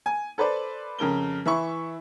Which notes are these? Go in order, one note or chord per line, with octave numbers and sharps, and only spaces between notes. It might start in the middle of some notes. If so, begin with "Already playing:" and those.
G#5
A4 B4 C5 D5
F2 C#3 A#4 G7
E3 E5 B5 C#6